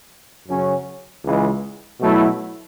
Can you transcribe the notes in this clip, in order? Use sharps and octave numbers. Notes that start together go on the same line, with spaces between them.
F#2 C#3 F#3 C#4
C#2 C#3 E3 G#3
B2 F#3 A3 E4